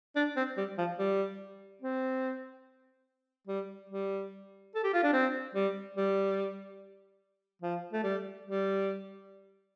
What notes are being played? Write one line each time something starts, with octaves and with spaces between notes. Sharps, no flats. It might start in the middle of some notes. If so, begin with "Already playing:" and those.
D4
C4
G3
F3
G3
C4
G3
G3
A4
G4
F4
D4
C4
G3
G3
F3
A3
G3
G3